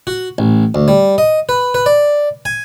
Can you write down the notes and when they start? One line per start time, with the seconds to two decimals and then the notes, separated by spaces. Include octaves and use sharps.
0.07 F#4
0.38 A1
0.75 D2
0.88 G3
1.18 D#5
1.49 B4
1.75 B4
1.86 D5
2.45 G#5